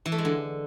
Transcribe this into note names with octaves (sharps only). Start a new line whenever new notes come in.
E3
A3
G#3
D3